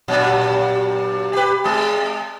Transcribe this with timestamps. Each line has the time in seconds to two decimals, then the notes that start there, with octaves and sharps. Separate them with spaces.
0.08 G2 A#2 F#3
1.33 G4 B4
1.64 G#3 G#4